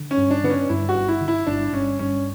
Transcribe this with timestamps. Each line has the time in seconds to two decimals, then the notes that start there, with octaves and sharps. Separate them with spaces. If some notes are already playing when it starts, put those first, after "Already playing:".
Already playing: D3
0.11 C#4
0.17 G2
0.30 D4
0.43 D3 B3
0.50 C#4
0.69 G2 E4
0.89 F#4
0.95 G1
1.08 E4
1.21 D3
1.28 E4
1.47 G1 D4
1.72 G1 C#4
1.99 G2 C#4